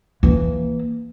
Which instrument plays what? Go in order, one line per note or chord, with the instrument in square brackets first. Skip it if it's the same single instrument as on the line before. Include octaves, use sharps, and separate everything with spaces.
[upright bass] E3 A#3